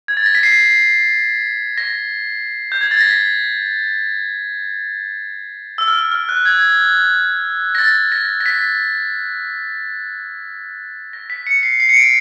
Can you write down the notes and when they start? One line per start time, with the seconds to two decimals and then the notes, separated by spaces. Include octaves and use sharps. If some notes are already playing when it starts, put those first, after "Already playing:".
0.08 G#6
0.17 A6
0.26 A#6
0.35 B6
0.43 C7
1.78 A#6
2.72 G6
2.81 G#6
2.91 A6
3.01 A#6
3.10 B6
5.78 E6
5.88 F6
5.95 E6
6.12 F6
6.29 F#6
6.45 G#6
7.75 A#6
7.78 A6
8.12 A#6
8.40 A#6
8.46 B6
11.13 A#6
11.30 B6
11.47 C#7
11.63 C7
11.80 C7
11.89 C#7
11.97 D7